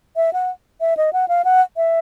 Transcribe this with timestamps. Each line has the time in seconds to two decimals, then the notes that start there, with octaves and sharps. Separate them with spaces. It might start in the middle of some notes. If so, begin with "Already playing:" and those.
0.16 E5
0.33 F#5
0.81 E5
0.97 D#5
1.13 F#5
1.28 F5
1.45 F#5
1.77 E5